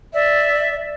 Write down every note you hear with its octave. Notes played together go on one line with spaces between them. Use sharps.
D5 E5